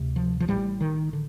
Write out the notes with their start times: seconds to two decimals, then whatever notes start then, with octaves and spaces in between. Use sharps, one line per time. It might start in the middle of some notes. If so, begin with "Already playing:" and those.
Already playing: D2 C3
0.16 F3
0.40 F3
0.48 A1 A2 G3
0.81 D#3
1.13 D3